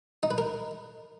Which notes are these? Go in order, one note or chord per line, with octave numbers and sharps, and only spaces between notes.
D#4
B4
A#4